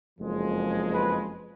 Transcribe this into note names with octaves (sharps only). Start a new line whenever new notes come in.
F#1 F2 F3 G#3
B4